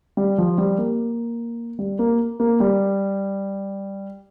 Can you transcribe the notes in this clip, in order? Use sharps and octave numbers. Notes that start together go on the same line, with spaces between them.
G3
F3
G3
A#3
G3
A#3
A#3
G3